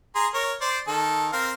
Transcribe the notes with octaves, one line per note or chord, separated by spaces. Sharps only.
G#4 A#5 C6
A#4 C#5
C5 D5
D#3 A4
C4 A#4 F5